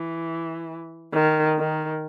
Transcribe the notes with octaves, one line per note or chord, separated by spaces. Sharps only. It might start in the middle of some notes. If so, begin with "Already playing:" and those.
Already playing: E3
D#3
D#3